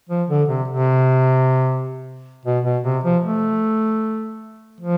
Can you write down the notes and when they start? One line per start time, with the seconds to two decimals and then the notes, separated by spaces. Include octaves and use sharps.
0.09 F3
0.29 D3
0.48 C3
0.68 C3
2.45 B2
2.64 B2
2.84 C3
3.04 F3
3.24 A3
4.80 F3